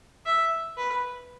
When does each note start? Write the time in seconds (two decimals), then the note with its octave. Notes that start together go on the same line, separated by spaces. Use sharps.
0.26 E5
0.77 B4